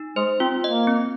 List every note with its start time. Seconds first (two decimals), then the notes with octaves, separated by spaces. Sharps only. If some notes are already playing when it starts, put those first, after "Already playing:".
Already playing: D#4
0.16 G#3 C5
0.40 C4 F4
0.64 A#3 D#5
0.87 C4